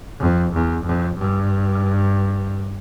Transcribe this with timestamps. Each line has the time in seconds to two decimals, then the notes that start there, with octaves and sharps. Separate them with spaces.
0.20 F2
0.53 E2
0.83 F2
1.15 G2